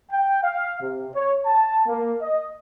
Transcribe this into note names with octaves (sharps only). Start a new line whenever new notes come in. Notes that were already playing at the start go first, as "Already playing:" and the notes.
G5
F5
C3
C#5
A5
A#3
D#5